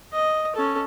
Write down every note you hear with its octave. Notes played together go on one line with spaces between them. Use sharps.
D#5
C#4 A4